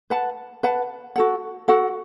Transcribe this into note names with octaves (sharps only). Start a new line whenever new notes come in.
B4 F#5 A5
B4 F#5 A5
F#4 A4 F#5
F#4 A4 F#5